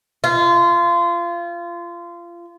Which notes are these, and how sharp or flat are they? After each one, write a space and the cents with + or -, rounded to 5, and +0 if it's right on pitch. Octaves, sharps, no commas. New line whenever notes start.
F4 -25